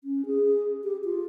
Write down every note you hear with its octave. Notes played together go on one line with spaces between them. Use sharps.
C#4
G#4
G4
F4